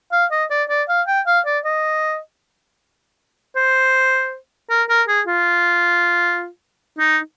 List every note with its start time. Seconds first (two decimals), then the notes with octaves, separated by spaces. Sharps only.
0.12 F5
0.32 D#5
0.50 D5
0.69 D5
0.89 F5
1.08 G5
1.27 F5
1.46 D5
1.65 D#5
3.56 C5
4.70 A#4
4.89 A#4
5.08 G#4
5.27 F4
6.99 D#4